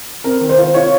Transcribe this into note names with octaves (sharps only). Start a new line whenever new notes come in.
C4 A#4
D#3
C5
F4
F4 C#5